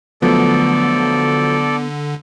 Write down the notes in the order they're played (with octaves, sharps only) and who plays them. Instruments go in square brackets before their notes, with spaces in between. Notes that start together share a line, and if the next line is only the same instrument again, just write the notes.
[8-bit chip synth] D3 [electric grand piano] F3 F#3 A3 [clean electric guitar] B3 [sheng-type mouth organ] A4 D5